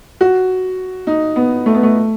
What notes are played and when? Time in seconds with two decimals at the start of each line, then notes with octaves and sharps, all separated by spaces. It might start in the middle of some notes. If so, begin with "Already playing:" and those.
0.21 F#4
1.07 D#4
1.36 B3
1.66 A3
1.75 B3
1.83 A3